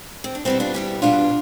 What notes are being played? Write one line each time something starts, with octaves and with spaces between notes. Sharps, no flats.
C4
D4
B2 G3 B3 C4 E4
D4 F4
B2 G3 B3 E4 G4
B2 G3 B3 D4 F4